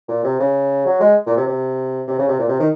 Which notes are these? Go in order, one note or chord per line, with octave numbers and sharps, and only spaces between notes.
A#2
C3
C#3
F#3
G#3
A#2
C3
C3
C3
C#3
C3
A#2
C3
D#3